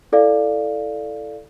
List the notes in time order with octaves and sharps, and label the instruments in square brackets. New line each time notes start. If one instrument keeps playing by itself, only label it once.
[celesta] E4 A4 D5 F5